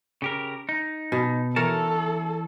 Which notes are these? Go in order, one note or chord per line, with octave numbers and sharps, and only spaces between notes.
C#3 G4 A#4
D#4
B2
E3 A4 A#4 C#5 A5